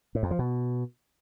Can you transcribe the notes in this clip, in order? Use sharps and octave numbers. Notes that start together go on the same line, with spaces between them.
A2
F2
F3
B2